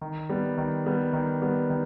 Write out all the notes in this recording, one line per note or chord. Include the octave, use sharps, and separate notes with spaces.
D#3
G3 B3
D#3
G3 B3
D#3
G3 B3
D#3